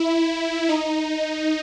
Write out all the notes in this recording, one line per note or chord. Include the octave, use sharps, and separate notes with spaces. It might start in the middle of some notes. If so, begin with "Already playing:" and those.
Already playing: E4
D#4